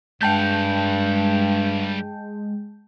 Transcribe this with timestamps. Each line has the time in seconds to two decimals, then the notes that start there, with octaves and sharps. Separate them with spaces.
0.21 G2 G3 G#3 F#5 G5 A5 G6